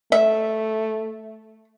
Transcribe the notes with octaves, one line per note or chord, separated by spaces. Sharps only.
A3 E5